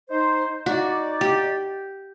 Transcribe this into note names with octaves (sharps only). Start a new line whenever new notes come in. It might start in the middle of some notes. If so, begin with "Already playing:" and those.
D#4 C5
D#4 F#4 D5
G4